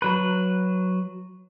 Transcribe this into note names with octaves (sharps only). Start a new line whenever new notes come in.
F#3 B4